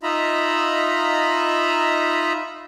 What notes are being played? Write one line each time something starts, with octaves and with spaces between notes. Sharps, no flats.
D#4 F4 D#5 E5 A#5 B5